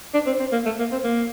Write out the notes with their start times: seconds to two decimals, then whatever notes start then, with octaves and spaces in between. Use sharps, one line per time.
0.14 D4
0.26 C4
0.40 C4
0.52 A#3
0.66 A3
0.79 A#3
0.92 C4
1.04 A#3